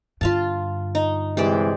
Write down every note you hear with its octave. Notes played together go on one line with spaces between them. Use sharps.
G2 D3 F4 F5 A5
D#4
C3 E3 G#3 G4 C5 D5